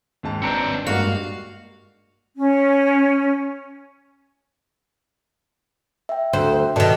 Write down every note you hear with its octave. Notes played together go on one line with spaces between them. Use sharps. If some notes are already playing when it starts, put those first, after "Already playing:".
D#2 G#2 A5
G#1 C4 D4 B4 A#5 C#7
G2 G3 G#3 A#3 F#4 F5
C#4
E5 G5
D2 C5
B2 D#3 A4 D5 A5